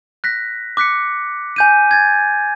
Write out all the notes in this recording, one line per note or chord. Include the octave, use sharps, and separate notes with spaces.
F#6 A#6 B6
D6 F#6 B6 C#7
G#5 G6 D#7
G#6 A6